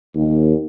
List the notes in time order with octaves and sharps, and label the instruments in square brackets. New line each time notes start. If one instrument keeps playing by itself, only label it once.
[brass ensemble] D#2